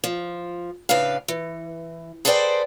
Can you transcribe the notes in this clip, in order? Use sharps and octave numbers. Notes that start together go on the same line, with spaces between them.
F3
A2 C#3 D4 B4 F5
E3
G#4 A4 B4 C5 D5 G5